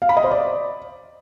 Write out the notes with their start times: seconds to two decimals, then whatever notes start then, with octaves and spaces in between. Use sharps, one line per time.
0.02 F5
0.09 B5
0.17 D#5
0.24 C5
0.31 D5